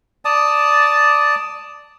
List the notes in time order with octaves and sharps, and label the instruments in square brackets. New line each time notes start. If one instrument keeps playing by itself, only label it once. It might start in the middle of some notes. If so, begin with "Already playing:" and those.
[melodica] D5 A5 D#6